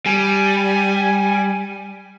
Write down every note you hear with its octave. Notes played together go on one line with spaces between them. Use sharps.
G3 G#5